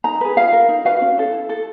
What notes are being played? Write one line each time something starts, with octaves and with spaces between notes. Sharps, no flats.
D#4 A#5
G#4 B4
F4 F5
A#4
D#4
F#4 B4 F5
C#4
E4 A4
E4
A4